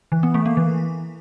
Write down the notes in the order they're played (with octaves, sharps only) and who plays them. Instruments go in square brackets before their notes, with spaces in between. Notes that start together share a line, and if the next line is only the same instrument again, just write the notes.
[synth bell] E3
B3
A3
A#3
E3